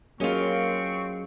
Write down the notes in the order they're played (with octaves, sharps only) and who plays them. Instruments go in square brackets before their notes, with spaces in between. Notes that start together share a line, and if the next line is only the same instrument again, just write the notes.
[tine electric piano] F#3 G#4 D#5 [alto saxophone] A#3 [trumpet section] C4 C#6 [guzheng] C#4 F4